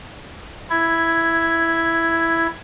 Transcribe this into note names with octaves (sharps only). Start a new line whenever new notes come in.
E4 G#6